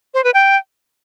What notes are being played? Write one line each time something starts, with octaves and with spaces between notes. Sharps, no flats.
C5
B4
G5